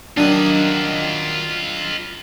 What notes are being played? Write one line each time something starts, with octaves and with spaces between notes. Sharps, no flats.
D#3 F#3 D4 F4 D#5